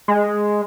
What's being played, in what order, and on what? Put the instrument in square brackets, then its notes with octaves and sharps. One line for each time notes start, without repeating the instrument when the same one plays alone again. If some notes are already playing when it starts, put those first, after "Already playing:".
[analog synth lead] G#3